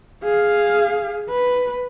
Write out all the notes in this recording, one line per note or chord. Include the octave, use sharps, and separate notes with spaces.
G#4 F5
B4